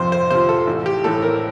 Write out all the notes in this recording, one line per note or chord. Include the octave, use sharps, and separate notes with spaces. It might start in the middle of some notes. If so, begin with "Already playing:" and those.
Already playing: F2 C3 F3 C5
C5
C3 F3 C5
A4
A1
G4
A2 E3 A4
A#4